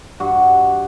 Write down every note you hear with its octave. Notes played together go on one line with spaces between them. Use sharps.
G2 F#4